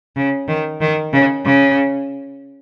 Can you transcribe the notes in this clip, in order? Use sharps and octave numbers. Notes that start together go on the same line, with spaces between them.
C#3
D#3
D#3
C#3
C#3